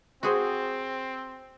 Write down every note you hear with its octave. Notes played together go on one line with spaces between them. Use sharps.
C4 F#4 G#4 C5